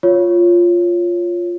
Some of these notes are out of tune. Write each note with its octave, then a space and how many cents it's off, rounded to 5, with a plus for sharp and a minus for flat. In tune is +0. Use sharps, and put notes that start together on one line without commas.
F4 +0 C#5 +0